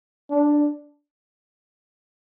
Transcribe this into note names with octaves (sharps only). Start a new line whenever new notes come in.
D4